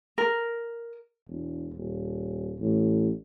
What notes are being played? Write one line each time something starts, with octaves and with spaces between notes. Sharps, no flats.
A#4
E1
D#1
A1